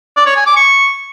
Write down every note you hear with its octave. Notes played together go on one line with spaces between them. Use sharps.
D5
C#5
G#5
D6
C#6